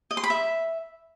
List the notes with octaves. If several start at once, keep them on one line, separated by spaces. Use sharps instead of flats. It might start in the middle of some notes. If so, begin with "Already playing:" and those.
D#5
C6
B5
E5